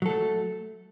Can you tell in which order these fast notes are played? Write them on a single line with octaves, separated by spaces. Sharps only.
F#3 A4 A3